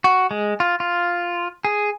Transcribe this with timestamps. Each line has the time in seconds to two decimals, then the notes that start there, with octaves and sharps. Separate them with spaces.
0.04 F#4
0.31 G#3
0.60 F4
0.80 F4
1.65 G#4